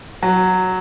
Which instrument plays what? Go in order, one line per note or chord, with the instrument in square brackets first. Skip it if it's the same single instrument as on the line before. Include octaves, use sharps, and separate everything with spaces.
[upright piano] F#3